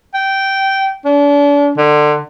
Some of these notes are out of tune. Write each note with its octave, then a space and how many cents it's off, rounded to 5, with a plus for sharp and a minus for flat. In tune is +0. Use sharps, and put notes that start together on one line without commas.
G5 -15
D4 -40
D3 +25